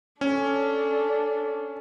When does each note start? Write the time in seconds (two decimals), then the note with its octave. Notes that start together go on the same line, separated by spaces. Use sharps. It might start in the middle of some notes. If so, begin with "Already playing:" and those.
0.21 C#4 D4 A4